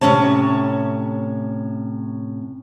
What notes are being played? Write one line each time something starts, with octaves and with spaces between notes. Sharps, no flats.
A2 C3 G#3 C#4 C#5 A5